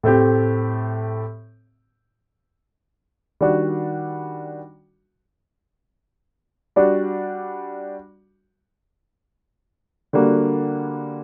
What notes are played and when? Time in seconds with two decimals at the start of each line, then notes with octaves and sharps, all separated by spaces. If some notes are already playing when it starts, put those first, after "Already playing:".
0.03 A2 A3 C4 G4
3.41 D#3 G3 D4 F#4
6.76 G3 D4 F#4
10.13 D3 G3 A#3 F#4